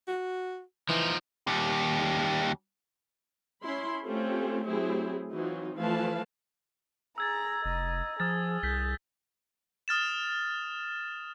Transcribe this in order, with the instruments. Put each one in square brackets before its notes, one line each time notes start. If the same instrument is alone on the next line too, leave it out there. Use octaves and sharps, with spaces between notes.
[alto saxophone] F#4
[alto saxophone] E3 [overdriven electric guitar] F3 D#4
[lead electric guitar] D#2 G3
[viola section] C#4 E4 B5 C6
A3 C4 C#4 F4 G4 A4
F#3 A3 C4 E4 G4 G#4
E3 F#3 C4 D#4 F4
E3 F3 A3 B4 F5 A5
[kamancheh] G#4 A#5 [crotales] E6 G#6 A6
[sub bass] F1 [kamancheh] D#5 A#5
[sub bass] F3 [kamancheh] G#4 [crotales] D#6 F6 A6
[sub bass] C2 [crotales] G6 B6 G7
[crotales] D#6 F6 A6 E7